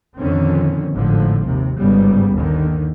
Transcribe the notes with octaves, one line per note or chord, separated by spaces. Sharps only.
F2 A#2 D3 D#3 C4 C#4
G#1 A2 D3 F3
D#2 C3
G1 G#2 C#3 G3 B3
D#2 D3 D#3